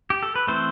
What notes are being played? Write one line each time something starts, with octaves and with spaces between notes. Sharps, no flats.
G4
A4
B4
E3 A3 C4 A4 C5